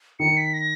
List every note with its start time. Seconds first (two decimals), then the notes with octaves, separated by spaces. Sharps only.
0.20 D#3 C#7
0.37 B6
0.54 A#6